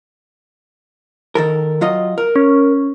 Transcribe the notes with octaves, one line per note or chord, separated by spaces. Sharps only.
D#3 A4 A#4
F#3 F4 D#5
A#4
C#4